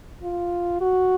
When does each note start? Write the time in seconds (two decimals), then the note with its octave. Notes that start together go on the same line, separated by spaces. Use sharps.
0.23 F4
0.81 F#4